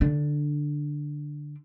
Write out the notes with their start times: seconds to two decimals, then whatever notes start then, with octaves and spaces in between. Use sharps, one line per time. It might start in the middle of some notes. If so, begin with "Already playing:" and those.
0.01 D3 D4